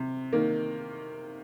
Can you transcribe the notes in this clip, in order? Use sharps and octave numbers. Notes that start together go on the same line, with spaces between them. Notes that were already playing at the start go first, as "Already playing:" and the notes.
Already playing: C3
D#3 A#3